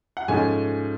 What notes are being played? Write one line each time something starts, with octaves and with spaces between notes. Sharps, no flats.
F#5
G#2 F3 A3 C#4 G#5